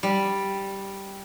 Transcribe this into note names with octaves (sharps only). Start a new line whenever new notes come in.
G3